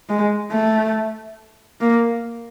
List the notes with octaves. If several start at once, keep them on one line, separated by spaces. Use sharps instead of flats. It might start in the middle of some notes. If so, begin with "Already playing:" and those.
G#3
A3
A#3